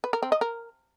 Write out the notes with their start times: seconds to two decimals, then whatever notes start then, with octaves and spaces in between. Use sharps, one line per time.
0.04 B4
0.13 A#4
0.23 C4
0.32 D#5
0.41 A#4